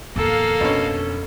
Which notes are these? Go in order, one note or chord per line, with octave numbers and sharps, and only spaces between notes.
D1 E2 A#3 A4 F5
F2 B2 D3 C#4